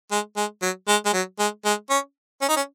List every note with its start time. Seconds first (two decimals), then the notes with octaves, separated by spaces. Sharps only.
0.11 G#3
0.37 G#3
0.62 F#3
0.88 G#3
1.06 G#3
1.13 F#3
1.39 G#3
1.65 G#3
1.90 C#4
2.41 C#4
2.49 D#4
2.57 C#4